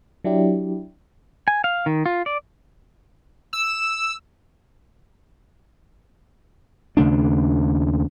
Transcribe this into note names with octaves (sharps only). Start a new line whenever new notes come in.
F#3 D4 E4 G4
G#5
F5
D#3
F4
D5
E6
D#2 C#3 A3 D4